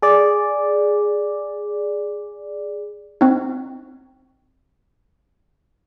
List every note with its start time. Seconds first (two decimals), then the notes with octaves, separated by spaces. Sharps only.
0.02 G#4 D5
3.21 C4 D#4